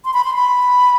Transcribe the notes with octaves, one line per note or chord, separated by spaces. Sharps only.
C6
B5
C6
B5